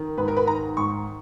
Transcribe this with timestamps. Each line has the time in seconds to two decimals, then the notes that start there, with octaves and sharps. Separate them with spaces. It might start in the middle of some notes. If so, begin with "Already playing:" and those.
Already playing: D#3
0.18 G#2 B4
0.28 A#4
0.37 B4
0.47 D#3 A#5
0.77 G#2 C#6